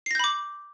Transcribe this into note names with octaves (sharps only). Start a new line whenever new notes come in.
B5 D6 G6 A#6 C7